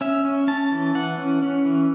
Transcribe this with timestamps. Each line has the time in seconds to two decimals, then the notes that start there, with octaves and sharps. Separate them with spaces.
0.01 C#4 E5
0.25 C#4
0.48 C#4 A5
0.71 E3
0.95 E3 F#5
1.18 C#4
1.42 C#4
1.65 E3